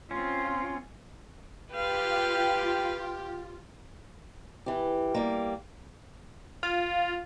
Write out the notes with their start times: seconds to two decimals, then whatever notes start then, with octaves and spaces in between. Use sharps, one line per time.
0.11 C4 C#4 F4
1.72 F4 G4 B4 F5
4.66 E3 G4
5.14 G3 A#3
6.63 F4